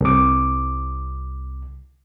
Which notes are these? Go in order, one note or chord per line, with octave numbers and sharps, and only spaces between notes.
C2 D6